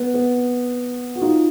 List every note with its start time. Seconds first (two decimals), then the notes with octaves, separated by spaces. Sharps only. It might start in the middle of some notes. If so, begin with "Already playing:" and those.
Already playing: B3
0.14 B3
1.15 F#4
1.22 D#4 F4